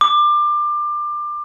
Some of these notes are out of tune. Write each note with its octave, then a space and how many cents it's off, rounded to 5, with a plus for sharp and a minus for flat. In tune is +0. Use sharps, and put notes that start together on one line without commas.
D6 +25